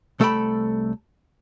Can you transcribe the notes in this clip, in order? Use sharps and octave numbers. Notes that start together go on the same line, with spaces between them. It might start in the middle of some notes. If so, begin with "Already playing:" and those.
C2 A3 A4 D#5 G5 B5